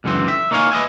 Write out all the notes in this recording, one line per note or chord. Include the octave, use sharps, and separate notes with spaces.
C#2 F#2 D3 E3 C4
E5
A#3 D#4 C#5 D5 F5 G#5
B4 D#5 E5 G#5